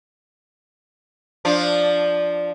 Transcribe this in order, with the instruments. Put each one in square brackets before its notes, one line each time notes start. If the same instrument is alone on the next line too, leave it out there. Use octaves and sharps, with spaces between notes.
[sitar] F3 D4 F4